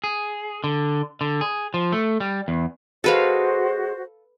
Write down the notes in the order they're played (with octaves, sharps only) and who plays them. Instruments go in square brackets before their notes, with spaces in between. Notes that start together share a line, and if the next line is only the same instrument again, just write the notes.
[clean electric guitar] G#4
D3
D3
G#4
F3
A3
G3
E2
[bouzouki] G#3 [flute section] F#4 C5 [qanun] A4 B4 F5